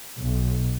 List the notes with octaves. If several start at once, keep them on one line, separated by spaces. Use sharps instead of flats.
B1